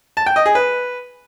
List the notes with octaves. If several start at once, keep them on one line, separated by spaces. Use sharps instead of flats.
A5
G5
D#5
G#4
B4